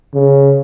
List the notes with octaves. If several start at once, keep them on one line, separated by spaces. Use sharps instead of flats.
C#3